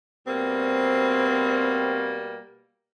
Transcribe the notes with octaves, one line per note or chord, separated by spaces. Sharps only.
B2 G3 A#3 C4